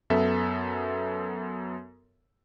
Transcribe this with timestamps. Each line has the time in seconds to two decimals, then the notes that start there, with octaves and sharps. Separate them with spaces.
0.10 F#2 B3 A4 E5